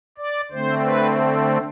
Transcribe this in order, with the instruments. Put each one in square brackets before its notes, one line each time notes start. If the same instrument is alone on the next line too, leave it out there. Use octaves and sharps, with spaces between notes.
[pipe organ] D5
D3 A3 C4 C5
B4